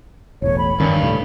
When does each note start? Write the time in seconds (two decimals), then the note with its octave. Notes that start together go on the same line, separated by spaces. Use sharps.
0.42 E1 A1 C#5
0.58 B5
0.80 G2 D#3 C#4
1.02 C2 A2